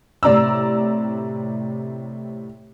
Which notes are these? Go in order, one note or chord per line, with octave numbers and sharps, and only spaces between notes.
A2 C3 D5 A#5 E6